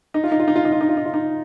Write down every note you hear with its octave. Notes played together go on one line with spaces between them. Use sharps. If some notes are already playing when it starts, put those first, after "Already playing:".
D#4
F4
D#4
F4
D#4
F4
D#4
F4
D#4
F4
D#4
F4
D#4